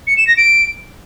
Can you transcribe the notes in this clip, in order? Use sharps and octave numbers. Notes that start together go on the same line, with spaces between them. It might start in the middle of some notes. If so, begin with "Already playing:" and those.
C#7
E7
A#6
D7